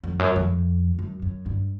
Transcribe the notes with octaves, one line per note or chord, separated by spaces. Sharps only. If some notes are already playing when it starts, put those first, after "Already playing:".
F2
F#2
F2
F#2
F#2
G2